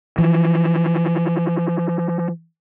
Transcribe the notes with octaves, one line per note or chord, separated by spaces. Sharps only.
E3 F3